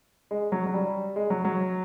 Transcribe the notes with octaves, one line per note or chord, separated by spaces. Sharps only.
G#3
F#3
F#3
G3
G#3
F#3
F#3